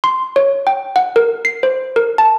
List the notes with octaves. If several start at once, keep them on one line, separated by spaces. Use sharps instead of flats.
C6
C#5
G5
F#5
A#4
C7
C5
A#4
A5